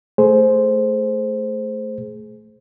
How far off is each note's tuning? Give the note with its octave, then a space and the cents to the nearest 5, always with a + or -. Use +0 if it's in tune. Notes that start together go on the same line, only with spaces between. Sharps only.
A3 +0 G#4 +20 C5 +0